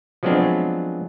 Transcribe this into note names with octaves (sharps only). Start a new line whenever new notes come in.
F3 F#3 G#3 B3 C4 D4